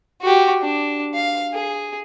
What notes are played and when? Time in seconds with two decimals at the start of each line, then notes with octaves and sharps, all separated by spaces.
0.21 F#4 G4
0.62 D4
1.14 F5
1.53 G#4